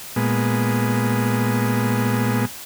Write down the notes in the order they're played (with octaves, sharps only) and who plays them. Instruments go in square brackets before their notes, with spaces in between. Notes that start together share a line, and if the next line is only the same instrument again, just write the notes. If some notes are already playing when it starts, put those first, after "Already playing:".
[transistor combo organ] A#2 G#3 B3